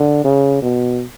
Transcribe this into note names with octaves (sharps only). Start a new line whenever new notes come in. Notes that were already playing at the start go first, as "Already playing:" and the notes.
Already playing: D3
C#3
B2